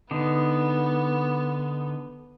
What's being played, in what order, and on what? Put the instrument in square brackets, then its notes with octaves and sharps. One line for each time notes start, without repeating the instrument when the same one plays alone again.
[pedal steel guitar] D3 D#4 [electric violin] B3